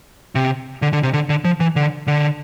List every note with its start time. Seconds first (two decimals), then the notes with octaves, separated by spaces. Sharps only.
0.35 C3
0.82 D3
0.93 D3
1.03 C3
1.14 D3
1.29 D3
1.45 F3
1.60 E3
1.76 D3
2.07 D3